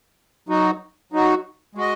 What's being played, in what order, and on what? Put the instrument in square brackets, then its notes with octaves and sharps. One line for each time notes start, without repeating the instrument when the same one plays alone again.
[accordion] F#3 D#4 F#4
F#3 D#4 F#4
G#3 F#4 D#5